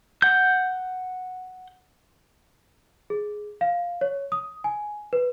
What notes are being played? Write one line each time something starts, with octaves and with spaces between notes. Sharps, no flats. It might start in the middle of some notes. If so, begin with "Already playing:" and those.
F#5 G6
G#4
F5
C#5
D#6
G#5
B4